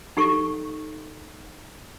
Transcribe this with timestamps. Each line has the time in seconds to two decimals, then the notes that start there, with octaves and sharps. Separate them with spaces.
0.17 D#4 G4 A4 C#6